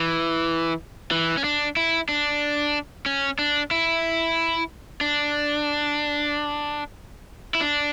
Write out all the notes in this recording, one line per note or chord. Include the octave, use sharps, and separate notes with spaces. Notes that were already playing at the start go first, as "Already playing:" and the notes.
Already playing: E3
E3
C#4
D4
E4
D4
C#4
D4
E4
D4
E4
D4